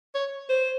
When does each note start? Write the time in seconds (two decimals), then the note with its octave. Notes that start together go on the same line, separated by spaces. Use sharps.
0.15 C#5
0.49 C5